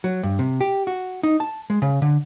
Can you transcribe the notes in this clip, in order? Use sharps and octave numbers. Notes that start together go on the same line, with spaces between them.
F#3
G2
C3
G4
F#4
D#4
A5
G#3
C#3
D3